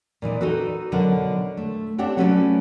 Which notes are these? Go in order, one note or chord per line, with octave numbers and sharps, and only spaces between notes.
A#2 E3 D#4 D5
D#4 F#4 A4 B4
B2 D3 F#3 A#4 D5 F#5
A3
C4 D4 G4 C#5 F#5 G5
F#3 A3 C#4 F#4 B4 D5